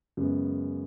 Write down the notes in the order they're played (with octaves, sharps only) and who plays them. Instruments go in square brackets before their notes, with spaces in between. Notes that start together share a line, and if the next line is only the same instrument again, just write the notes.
[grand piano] F#2 C#3 G#3 B3